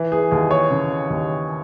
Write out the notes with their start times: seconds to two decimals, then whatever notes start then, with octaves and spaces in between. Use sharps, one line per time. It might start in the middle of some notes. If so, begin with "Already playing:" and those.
Already playing: E3
0.12 G#4
0.31 D#2 G#4
0.51 C#5
0.70 C#3
1.10 D#2